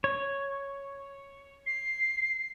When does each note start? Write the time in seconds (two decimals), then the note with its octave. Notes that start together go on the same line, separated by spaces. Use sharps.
0.04 C#5
1.66 C7